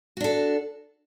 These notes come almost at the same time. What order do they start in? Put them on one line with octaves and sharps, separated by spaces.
F#4 D4 A4